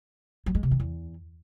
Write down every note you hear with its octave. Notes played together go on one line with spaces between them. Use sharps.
F#3
G#3
C3
D#3
E2